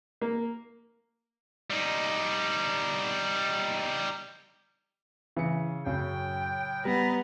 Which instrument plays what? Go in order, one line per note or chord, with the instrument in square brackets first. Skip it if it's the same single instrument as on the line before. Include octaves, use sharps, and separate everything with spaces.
[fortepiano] A#3
[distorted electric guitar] G3 D#4
[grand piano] C#3 C#7 [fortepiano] E3
[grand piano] F#2 [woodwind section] A2 F#3 G5 [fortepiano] C#3
[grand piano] G3 [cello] B3 [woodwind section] A#5